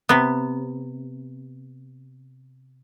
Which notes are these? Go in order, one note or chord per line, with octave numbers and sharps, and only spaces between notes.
C3 B3